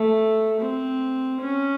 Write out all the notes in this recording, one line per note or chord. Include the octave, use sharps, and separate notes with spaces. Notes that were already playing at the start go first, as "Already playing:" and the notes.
Already playing: A3
C4
C#4